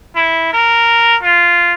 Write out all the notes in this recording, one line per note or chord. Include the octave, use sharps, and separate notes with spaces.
E4
A#4
F4